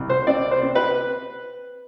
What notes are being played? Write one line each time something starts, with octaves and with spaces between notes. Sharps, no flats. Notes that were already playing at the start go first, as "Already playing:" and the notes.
Already playing: C2
C5
C4 D5
C5
C4
B4